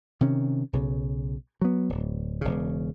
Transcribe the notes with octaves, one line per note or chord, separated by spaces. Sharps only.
C3 D#3 C#4
B1 C#3
F#3 B3
D1
E1 C#3